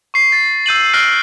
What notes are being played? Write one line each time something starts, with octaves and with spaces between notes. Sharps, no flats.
C#6 C7
A6
E6 G6 D#7 F#7
F6 F#6 A#6 C7 D7